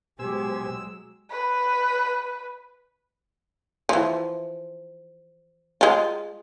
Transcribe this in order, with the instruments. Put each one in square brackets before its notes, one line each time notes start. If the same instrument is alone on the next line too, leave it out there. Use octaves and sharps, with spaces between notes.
[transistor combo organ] B2 C5 G#5 [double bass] F#3 G#3 [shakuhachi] G4 [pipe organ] E6
[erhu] B4
[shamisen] E3 F3
G#3 F4